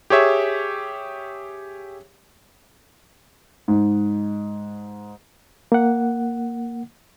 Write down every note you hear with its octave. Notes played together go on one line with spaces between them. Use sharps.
G4 G#4 C#5 E5
G#2
A#3 F#5